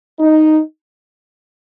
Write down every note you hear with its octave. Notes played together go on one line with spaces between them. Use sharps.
D#4